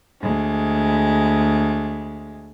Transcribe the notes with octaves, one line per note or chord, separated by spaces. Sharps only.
D2 G#3